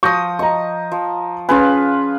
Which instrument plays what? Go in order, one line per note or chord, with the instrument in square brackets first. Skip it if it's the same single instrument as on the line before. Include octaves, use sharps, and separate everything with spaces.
[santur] F3 D#6 [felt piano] C#6 G6 A#6
[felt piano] D#5 A#5 [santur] C#6
[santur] F3
[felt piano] C#4 G#5 [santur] F4 G#4 B4